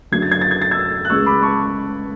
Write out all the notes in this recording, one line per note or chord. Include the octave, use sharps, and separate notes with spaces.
F#1 F#2 D3 F#3 A3 G#6
A6
G#6
A6
G#6
A6
E6 G#6
F#6
C#2 C#3 G#3 C#6 E6
B5 D6
A5 C#6